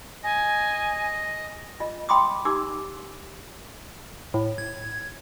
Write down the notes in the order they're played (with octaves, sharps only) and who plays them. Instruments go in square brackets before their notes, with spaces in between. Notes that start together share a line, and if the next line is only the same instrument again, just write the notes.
[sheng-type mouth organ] D#5 [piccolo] G#5
[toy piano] F4 D#5
G5 B5 C6 D6 D#6
D#4 G4 D6 E6
[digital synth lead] A2
G#6